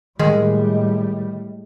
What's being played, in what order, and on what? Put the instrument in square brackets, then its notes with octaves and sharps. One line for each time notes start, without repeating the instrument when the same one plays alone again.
[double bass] A2 G3 [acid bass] D#3 [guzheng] G#3